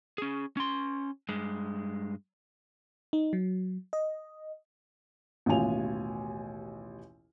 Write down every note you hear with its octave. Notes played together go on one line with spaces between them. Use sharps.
C#4 G#4
C#4 C6
G2 G#3
D#4
F#3
D#5
A1 D#2 B2 F4 G#5 F7